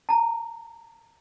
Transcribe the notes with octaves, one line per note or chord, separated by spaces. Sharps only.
A5 A#5